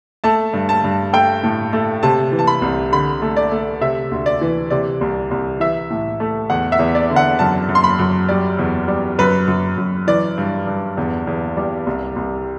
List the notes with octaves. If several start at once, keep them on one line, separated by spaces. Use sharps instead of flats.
A3 A5
G2
A5
G2
A3 G5
A2
A3
C3 A5
E3
A5
B5
C2
D3 B5
A3
D5
A3
C3 E5
D2
D5
E3
C3 D5
C2
C2
E3 E5
A2
A3
E2 F#5
E5
E2
D5
D3
F#5
F#2 A5
F#2
C6
B5
F#2
G3 D5
E2
G3
F#2 B4
F#2
F#2
E3 D5
G2
G2
E2
E2
G3
C2
C2